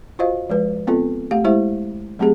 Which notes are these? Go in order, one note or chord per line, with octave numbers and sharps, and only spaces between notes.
F4 F#4 C5 D#5 F5
F3 G#3 B4
B3 C4 F4 A4
A3 G4 F5
G#3 E4 G4 C5 E5
F#3 A3 C4 G4 G#4